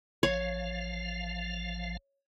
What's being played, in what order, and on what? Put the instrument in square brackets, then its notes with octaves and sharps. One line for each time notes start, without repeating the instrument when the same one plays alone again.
[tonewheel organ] A1 F3 F5 [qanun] C#5